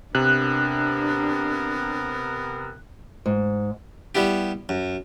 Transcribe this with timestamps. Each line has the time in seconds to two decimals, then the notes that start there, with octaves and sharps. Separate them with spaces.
0.15 C3 B3 D4 A#4 F#6
3.26 G#2
4.15 G3 B3 E4 G4
4.69 F#2